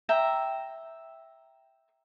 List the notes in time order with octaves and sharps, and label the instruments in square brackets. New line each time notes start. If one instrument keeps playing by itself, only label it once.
[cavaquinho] E5 G5 A#5